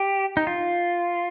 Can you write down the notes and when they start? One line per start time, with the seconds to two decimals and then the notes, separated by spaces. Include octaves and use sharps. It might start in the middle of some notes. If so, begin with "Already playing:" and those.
Already playing: G4
0.37 D#4
0.47 F4